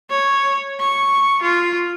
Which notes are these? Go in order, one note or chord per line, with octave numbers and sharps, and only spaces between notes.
C#5
C#6
F4